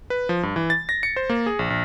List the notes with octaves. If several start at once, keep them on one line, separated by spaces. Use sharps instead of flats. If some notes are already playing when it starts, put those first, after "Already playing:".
B4
F3
G2
E3
A6
A#6
C#7
C5
A#3
G#4
A#1
A#1